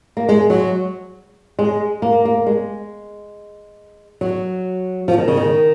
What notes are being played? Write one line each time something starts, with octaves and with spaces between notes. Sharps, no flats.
A#3
G#3
F#3
G#3
A#3
A#3
G#3
F#3
F3
D#3
C#3
D#3